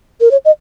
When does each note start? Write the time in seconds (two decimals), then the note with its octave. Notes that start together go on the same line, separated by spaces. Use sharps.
0.21 A#4
0.31 C#5
0.45 D#5